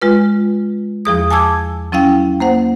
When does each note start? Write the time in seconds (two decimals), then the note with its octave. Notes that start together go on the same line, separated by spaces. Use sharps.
0.02 G#3 F4 B4
1.05 E2 F3 G#4 D#6
1.31 G#5 A5 D6 E6 G#6
1.92 F#3 C#4 E4 F5 G5
2.40 A#3 C5 F#5